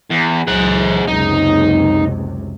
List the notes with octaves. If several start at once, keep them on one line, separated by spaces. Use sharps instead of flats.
E2
C#2 E3 F#3 G#3 F#5
F#1 C#2 C3 D#4